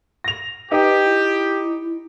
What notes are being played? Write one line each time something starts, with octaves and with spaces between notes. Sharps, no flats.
A#6 F7
D#4 G4 B4
E4